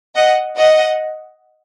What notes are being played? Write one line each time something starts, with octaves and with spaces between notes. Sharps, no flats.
D#5 F#5
D#5 F#5